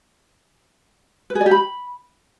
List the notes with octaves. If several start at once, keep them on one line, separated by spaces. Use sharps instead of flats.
B4
G#4
D5
G4
B5